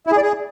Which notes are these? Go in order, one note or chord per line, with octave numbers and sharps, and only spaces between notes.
E4
G#4
D5
G#4